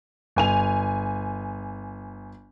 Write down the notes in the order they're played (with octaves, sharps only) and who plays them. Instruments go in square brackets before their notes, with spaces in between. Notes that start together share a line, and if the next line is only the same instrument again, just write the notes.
[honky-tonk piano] G1 G#5 F7